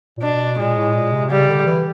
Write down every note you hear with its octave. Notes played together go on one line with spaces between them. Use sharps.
A#2
B2 D4
A#2 G#3
A2
A#2
C3
C#3 G3
D3
E3